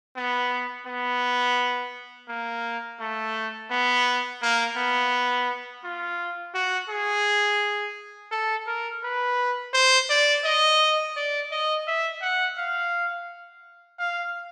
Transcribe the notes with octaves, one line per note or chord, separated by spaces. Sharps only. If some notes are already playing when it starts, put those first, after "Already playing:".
B3
B3
A#3
A3
B3
A#3
B3
F4
F#4
G#4
A4
A#4
B4
C5
D5
D#5
D5
D#5
E5
F#5
F5
F5